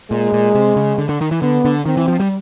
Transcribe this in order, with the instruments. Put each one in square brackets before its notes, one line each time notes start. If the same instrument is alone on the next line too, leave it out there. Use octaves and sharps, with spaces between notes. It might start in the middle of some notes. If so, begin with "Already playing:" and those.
[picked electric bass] A#2 [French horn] G#3
[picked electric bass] A#2
C3
C#3
D3
D3
D#3
E3
[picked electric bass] D3 [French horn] B3
[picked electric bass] D3
[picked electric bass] D#3 [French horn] C4
[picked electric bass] E3
F3
G3